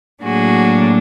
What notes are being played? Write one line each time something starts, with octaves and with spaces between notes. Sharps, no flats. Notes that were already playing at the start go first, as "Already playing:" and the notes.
A2 F#3 A#3 D4 F#4 G#4